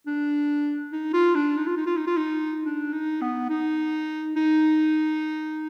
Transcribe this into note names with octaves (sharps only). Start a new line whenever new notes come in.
D4
D#4
F4
D4
D#4
F4
D#4
F4
D#4
F4
D#4
D4
D#4
B3
D#4
D#4